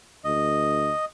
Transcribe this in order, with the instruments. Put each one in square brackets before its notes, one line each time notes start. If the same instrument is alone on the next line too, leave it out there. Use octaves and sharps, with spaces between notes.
[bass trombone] D2 [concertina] D#5